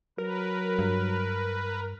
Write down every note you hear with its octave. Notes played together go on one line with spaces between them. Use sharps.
F#3 A#4 B4
G2